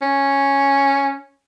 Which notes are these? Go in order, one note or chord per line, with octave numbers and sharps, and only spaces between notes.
C#4